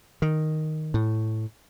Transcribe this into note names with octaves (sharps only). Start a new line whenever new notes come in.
D#3
A2